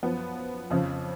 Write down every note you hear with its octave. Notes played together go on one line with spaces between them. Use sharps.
F#2 F3 B3
F2 C#3 F3